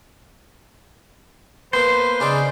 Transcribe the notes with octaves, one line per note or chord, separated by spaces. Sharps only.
A#3 B3 B4 C5
C#3 C#4 D#4 D5